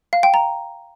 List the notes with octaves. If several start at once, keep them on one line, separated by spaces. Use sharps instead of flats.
F5
G5
A#5